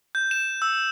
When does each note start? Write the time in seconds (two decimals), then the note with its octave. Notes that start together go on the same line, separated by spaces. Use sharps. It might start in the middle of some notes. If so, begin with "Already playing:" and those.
0.15 G6
0.31 E7
0.62 E6